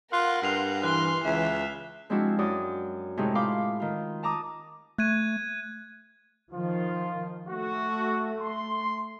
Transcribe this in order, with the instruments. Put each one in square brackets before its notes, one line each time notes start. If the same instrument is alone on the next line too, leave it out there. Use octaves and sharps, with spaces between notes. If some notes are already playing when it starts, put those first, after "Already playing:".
[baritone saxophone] F4 [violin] A#4 F#5 [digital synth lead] C6 [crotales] F#6
[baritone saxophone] G2 [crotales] F6 C7 F7
[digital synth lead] E3 [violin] C6 [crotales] F#6 G7
[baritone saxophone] C#2 [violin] E5
[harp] F3 G#3 C4 D4 E4 F#4
F#2 F#4 D5 D#6
A2 C3 G#3 C4 D#4
F4 F5 B5 C6 D6
D#3 F4
A5 A#5 D6 D#6
[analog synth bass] A3 [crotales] F#6 G#6 D#7
[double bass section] D#3 F3 [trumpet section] F4
[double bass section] A3 [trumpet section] F#4
[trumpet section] C6